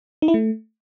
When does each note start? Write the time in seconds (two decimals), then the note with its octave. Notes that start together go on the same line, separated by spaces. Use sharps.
0.22 D#4
0.28 E4
0.34 A3